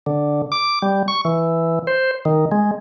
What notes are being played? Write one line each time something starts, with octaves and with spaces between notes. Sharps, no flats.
D3
D6
G3
C#6
E3
C5
D#3
G#3